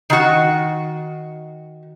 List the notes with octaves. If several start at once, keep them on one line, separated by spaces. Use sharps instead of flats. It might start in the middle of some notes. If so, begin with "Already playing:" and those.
D#3 F#4